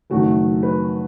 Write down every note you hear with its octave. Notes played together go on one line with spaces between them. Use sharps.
F#1 F#2 D#3 A3 F#4
B4